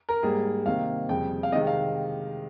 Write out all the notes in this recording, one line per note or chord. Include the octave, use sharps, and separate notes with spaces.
A#4
G#2 G3 A#3 G#4
C3 D#3 A#3 F5
F2 C#3 G3 G5
F5
C3 D#3 G#3 C4 D#5
F5